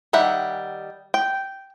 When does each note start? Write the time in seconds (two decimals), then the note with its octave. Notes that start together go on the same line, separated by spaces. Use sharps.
0.13 D#3 G3 E5 F#5
1.14 G5